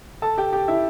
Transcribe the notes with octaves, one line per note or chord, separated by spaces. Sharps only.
A4 A5
G4 G5
G4 G5
E4 E5